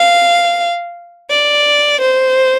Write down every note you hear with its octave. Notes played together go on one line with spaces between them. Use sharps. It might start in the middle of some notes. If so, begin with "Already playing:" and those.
Already playing: F5
D5
C5